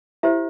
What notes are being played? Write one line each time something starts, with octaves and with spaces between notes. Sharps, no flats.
E4 G4 C5 E5